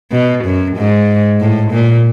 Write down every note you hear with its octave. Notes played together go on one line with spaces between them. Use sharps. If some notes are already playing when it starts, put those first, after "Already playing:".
B2
F#2
G#2
A2
A#2